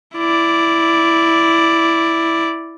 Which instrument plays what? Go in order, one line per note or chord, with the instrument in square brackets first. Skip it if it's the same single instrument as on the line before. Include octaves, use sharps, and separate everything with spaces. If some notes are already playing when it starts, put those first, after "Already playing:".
[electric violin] E4 D5